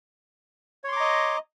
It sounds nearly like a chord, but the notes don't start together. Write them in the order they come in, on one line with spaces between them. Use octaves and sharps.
C#5 C6 D6 A#5 D#5